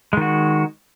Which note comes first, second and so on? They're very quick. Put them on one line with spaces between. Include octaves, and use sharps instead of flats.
G#3 D#3 F#4